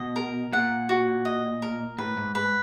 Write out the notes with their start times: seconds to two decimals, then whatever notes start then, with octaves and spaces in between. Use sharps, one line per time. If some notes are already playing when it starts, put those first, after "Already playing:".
Already playing: B2 D#5
0.16 A#4
0.53 A#2 F#5
0.89 F#4
1.25 D#5
1.62 A#4
1.98 A2 B4
2.17 G#2
2.35 G#2 B4